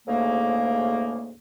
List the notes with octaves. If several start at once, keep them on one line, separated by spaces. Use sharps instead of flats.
D2 G#2 C#3 A3 A#3